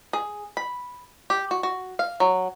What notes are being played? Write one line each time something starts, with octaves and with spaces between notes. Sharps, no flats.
G#4
B5
G4
F#4
F#4
F5
F#3